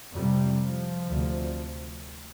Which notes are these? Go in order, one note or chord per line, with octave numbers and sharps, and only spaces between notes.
F2 C3 G3
F3
D2 C3